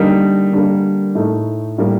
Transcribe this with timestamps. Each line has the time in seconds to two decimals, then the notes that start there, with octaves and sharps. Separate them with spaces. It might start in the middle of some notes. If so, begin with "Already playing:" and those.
Already playing: D3 G3 A#3 D#4
0.52 D3 G3 A#3
1.15 A2 A3 D#4
1.78 A2 G3 A#3